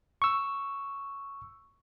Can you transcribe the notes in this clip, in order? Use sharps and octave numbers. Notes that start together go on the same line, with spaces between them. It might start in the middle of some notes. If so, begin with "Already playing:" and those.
C#6 E6